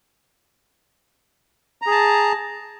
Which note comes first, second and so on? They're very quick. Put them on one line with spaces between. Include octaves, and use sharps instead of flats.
A#5 G#4 A5